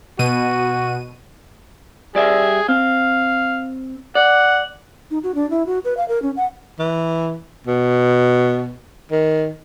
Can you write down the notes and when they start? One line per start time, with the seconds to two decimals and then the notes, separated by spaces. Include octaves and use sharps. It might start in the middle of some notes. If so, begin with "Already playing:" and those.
0.19 B2 F#4 D#7
2.15 G3 G#4 D5 E5
2.69 C4 F5
4.15 D5 F#5
5.11 D#4
5.23 F#4
5.35 D4
5.50 E4
5.67 F#4
5.85 B4
5.97 F5
6.08 A#4
6.22 C#4
6.36 F#5
6.79 E3
7.67 B2
9.11 D#3